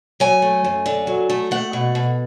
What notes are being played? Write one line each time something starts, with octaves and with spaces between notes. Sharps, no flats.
F#3 G#5
A3
F#2
D3
F#3
A3
A3 F#5
B2
B2